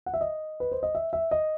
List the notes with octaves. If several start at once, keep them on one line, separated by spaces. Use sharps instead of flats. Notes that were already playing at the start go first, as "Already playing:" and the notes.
F#5
E5
D#5
B4
C5
D#5
E5
E5
D#5